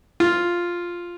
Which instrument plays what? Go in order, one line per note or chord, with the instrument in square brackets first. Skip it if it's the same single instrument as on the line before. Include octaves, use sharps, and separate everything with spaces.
[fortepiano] F4